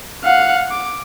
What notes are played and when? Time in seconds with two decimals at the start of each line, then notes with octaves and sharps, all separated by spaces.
0.24 F5 F#5
0.71 D6